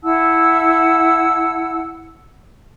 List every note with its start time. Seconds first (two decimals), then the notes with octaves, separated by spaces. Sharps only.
0.03 E4 F#5 A5 E6